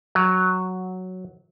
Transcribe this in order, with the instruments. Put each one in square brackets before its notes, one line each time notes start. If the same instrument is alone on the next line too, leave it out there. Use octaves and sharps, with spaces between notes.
[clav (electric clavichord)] F#3